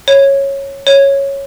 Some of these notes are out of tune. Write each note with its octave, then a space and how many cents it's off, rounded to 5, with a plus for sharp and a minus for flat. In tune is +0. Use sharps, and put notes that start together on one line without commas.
C#5 -10
C#5 -5